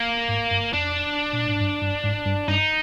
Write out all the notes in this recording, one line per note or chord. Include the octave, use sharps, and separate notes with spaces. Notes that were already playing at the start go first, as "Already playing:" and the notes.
Already playing: A#3
G#2
G2
F2 D4
A#2
G#2
G2
G2
G#2
G2
G2 D#4